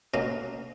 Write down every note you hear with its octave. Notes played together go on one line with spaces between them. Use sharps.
B2 A#3 C#4